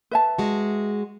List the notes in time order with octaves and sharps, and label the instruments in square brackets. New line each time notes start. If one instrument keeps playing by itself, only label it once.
[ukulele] B4 E5 A5
[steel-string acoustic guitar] G#3 F#4